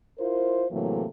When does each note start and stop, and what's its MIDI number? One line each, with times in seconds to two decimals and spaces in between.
0.19 0.66 64
0.19 0.66 65
0.19 0.66 70
0.19 0.66 72
0.71 1.04 45
0.71 1.04 48
0.71 1.04 52
0.71 1.04 54
0.71 1.04 57
0.71 1.04 58